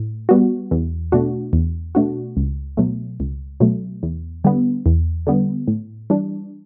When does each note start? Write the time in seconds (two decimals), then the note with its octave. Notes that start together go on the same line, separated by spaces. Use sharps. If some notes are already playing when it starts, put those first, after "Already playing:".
Already playing: A2
0.29 G3 B3 F#4
0.71 E2
1.12 B2 A3 D4 F#4
1.53 E2
1.95 B2 A3 D4 F#4
2.37 C#2
2.77 B2 F#3 A3
3.20 C#2
3.60 B2 F#3 A3
4.03 E2
4.44 D3 G3 B3
4.86 E2
5.27 D3 G3 B3
5.68 A2
6.10 E3 G3 D4